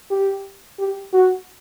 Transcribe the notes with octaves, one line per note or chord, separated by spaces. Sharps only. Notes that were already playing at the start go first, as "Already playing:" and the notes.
G4
G4
F#4